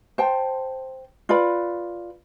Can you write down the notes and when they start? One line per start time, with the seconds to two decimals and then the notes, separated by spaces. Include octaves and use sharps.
0.18 C5 G5 A5
1.29 F4 B4 D5 B5